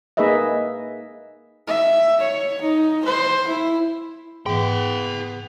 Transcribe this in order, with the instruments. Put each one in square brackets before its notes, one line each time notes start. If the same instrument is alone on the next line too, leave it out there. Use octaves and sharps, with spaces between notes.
[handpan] A#3 D#4 G#4 B4 D#5 E5
[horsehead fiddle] E5
C#5
D#4
C5
E4
[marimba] G#2 E3 [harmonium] B3 [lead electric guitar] G#4 G5